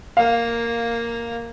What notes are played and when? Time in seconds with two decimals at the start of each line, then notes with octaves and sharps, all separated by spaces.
0.17 A#3 F5